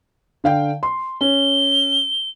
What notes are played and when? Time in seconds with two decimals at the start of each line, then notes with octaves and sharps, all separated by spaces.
0.44 D3 F5 G5
0.83 C6
1.21 C#4 G7